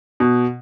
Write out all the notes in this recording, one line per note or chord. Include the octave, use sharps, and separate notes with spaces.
B2